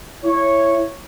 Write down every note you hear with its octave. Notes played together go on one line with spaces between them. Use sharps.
E4 C#5